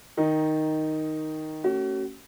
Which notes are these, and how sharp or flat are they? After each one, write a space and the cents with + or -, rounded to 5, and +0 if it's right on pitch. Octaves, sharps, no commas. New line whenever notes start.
D#3 +0 D#4 +0
A3 +40 C#4 +0 F#4 +40